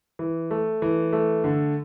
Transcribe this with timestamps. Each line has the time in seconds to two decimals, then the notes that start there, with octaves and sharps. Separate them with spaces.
0.19 E3
0.51 A3
0.82 E3
1.13 A3
1.44 D3